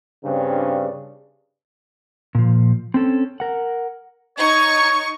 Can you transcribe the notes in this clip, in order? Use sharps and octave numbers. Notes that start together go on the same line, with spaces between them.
G2 C#3 C4 D4
A#2 F3
C4 C#4 A4
A#4 F#5
D#4 C#5 C#6